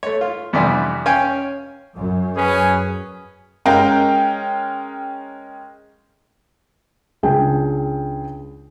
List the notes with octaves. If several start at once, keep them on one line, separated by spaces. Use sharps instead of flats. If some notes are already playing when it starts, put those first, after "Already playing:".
A3 C#5
F4
F2 C3 E3 G3 B3 D4
C#4 C#5 F5 G5 G#5
F#2
C#4 G#4 B4
G#3 C#4 A#4 F5 G5
C#2 D4 G#4 G5